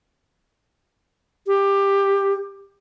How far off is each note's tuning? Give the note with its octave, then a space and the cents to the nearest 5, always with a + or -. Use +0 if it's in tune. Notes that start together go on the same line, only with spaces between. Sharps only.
G4 +15